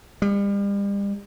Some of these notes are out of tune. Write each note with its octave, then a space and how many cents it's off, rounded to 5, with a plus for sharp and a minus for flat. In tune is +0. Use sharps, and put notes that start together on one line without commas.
G3 +40